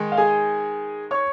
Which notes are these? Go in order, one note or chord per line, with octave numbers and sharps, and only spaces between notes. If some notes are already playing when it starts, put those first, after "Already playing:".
Already playing: D#3 G#3 D#4
F5
G#4 G#5
C#5 C#6